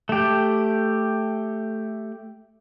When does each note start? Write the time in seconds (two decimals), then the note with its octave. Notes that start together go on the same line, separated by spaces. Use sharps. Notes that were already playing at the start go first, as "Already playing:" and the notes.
0.09 A3 G4